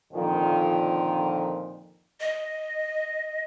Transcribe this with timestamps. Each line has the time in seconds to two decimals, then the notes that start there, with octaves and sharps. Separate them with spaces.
0.13 F2 A#2 D3 D#3 F3
2.20 D#5